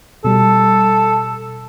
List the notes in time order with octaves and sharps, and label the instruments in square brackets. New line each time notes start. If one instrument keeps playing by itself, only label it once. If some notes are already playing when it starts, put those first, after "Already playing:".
[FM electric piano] B2 G3 [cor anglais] A4